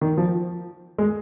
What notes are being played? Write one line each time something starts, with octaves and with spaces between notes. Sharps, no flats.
D#3
F3
G#3